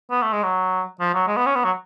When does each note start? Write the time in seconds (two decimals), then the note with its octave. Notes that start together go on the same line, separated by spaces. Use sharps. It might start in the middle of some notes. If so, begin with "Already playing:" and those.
0.11 B3
0.22 A3
0.33 G#3
0.43 F#3
1.00 F3
1.14 F#3
1.27 G#3
1.36 B3
1.46 C#4
1.55 B3
1.64 F#3